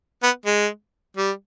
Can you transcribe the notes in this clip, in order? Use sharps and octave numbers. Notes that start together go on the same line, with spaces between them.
B3
G#3
G3